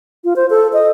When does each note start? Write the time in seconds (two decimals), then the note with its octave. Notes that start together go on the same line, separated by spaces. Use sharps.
0.24 F4
0.36 C5
0.50 A4
0.73 D#5